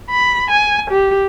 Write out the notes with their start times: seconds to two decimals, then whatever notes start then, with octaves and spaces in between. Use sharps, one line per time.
0.10 B5
0.51 G#5
0.91 G4